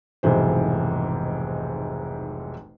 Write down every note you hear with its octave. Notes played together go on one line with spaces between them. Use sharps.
F1 B1 G#2 E3 C5